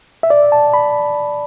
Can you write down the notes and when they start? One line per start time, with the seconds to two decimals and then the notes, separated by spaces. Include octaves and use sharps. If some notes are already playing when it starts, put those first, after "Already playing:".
0.23 E5
0.30 D5
0.52 A5
0.74 B5